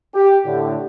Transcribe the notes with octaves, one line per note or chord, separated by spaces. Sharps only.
G4
A2 D3